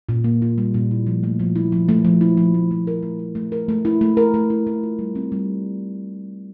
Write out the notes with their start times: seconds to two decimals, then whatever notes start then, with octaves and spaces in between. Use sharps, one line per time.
0.09 A#2
0.24 A#3
0.42 F4
0.58 G3
0.74 A#2
0.91 E4
1.07 F3
1.23 A3
1.40 F3
1.56 E4
1.72 F3
1.89 A3
2.05 F3
2.21 E4
2.37 F3
2.54 A3
2.71 F3
2.87 A#4
3.03 A3
3.19 E4
3.35 A3
3.52 A#4
3.69 A3
3.85 E4
4.01 A3
4.17 A#4
4.34 A3
4.50 E4
4.67 A3
4.83 F4
4.99 G3
5.15 C4
5.32 G3